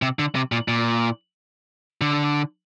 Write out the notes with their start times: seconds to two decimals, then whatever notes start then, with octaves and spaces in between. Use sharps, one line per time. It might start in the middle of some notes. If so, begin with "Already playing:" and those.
0.02 C3
0.19 D3
0.35 C3
0.52 A#2
0.68 A#2
2.01 D3